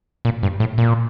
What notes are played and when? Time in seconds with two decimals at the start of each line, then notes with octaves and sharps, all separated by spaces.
0.25 A#2
0.43 G2
0.60 A2
0.78 A#2